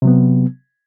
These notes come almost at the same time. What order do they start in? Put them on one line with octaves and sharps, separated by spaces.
C3 F#3 B3